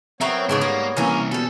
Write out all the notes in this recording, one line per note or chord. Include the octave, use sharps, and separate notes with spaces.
F#3 B3 C4 A#4 C#5 E5
G#2 C#3 F#3 G#3 C4 D4
G3 A#3
C2 E3 A#3 C#4 A#4
B2 G3 C#4 A4